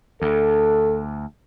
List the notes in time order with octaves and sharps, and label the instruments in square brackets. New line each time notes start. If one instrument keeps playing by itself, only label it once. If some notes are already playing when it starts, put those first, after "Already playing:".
[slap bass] D2 [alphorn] A4